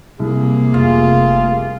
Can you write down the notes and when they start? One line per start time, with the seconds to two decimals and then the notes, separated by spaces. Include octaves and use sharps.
0.19 C2 C3 A#3 G#4
0.74 F1 F4